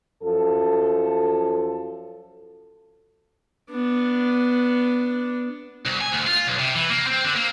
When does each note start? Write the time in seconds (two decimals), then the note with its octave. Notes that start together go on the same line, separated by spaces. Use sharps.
0.22 F#2 F3 A4
3.70 B3 D4
5.86 C2
6.01 G#5
6.12 D2
6.27 F4
6.47 B1
6.59 C3
6.75 E3
6.89 A#3
7.07 C4
7.24 D3
7.36 A#3